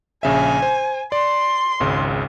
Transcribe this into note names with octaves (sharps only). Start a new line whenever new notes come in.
A#1 C#3 E5 G#5
C5
D5 C6
G#1 C#2 C#3